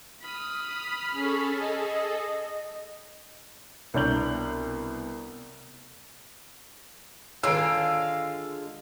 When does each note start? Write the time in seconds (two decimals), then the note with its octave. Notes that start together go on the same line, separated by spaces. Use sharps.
0.22 B5 D#6 F6
1.13 C#4 G#4 A4
1.60 D#5
3.94 C2 B2 D4 G6 F#7
7.43 D3 D#3 G#3 F4 C#5 F5 E6 D7